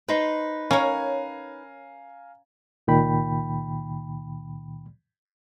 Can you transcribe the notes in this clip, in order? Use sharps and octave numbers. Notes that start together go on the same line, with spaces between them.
D#4 B4 C5
C#4 A#4 C#5 F5 G#5 A#5
C#2 A#2 D#3 G5 B5